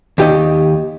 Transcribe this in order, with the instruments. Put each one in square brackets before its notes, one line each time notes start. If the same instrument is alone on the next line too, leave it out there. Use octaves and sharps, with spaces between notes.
[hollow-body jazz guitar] D#2 G4 D#5